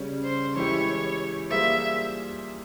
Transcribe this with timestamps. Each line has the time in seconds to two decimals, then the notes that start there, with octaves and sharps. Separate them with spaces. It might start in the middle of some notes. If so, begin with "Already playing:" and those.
Already playing: C#3 G3 C#4
0.24 C5
0.56 E3 G#3 E4 G4 C#5
1.50 G3 A#3 F4 G#4 C5 E5